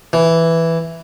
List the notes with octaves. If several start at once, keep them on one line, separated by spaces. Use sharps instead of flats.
E3